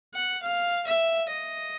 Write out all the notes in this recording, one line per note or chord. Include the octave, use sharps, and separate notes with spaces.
F#5
F5
E5
D#5